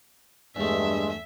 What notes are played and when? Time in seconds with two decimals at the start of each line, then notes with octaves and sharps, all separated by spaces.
0.56 E2 G2 G#3 A3 E5